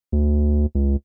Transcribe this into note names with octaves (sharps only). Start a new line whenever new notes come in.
D2
C#2